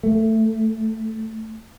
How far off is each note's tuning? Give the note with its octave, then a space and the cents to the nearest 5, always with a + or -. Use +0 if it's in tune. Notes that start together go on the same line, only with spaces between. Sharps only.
A3 +10